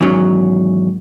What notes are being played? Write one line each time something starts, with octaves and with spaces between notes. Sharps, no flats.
E2 G#2 D#3 F#3 C#4